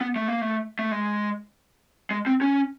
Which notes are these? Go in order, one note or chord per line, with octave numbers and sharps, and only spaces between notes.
B3
A3
A#3
A3
A3
G#3
G#3
C4
C#4